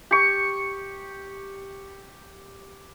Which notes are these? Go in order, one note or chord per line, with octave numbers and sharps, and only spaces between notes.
G4 C#6